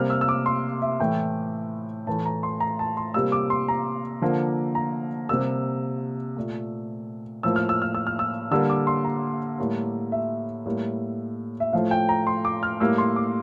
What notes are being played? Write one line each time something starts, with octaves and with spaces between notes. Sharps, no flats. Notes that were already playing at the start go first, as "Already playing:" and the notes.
Already playing: C3 G3 A#3 F6
E6
E6
D6
C6
E5
A2 E3 A3 G5
A2 E3 A3 A5
A#5
C6
A#5
A5
C6
C3 G3 A#3 E6
D6
C6
A#5
D3 F3 A#3
A#5
C3 G3 A#3 E6
A#2 A3
A2 F3 A#3 E6
F6
E6
F6
E6
F6
E6
D3 G3 A#3 E6
D6
C6
A#5
A2 G3 A#3
E5
A2 G3 A#3
E5
A2 F3 A3 F5
G5
A#5
C6
D6
F6
A2 G3 A#3 E6
C6
D6